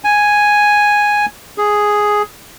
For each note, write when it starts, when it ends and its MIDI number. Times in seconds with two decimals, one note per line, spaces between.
0.04 1.26 80
1.58 2.22 68